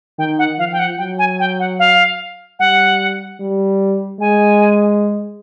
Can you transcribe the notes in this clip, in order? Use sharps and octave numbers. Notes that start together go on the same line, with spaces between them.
D#3 G5
F#5
F3 F5
G5
F#5
F#3 G5
G#5
G5
F#5
F5
G3 F#5
G3
G#3 G#5